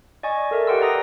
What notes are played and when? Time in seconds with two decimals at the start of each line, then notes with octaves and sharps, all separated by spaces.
0.23 D5 D#5 G#5 C#6
0.51 A4 A#4 E5
0.67 G4 B4 F#5 G5 C6 E6
0.80 D5 G5 A#5 D#6 A#6